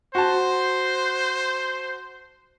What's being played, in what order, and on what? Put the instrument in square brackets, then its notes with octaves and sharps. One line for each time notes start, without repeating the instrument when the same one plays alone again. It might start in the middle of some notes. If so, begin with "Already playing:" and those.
[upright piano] F#4 A5 [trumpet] C5